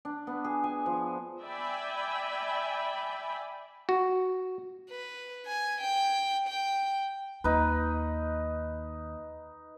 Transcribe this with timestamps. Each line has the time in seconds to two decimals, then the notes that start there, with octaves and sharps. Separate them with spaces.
0.05 D4
0.27 B3
0.45 G#4
0.64 G#5
0.86 F3
1.42 D5 E5 G5 G#5 B5
3.89 F#4
4.90 B4
5.46 G#5
5.81 G5
6.48 G5
7.44 D#2 D#4 B4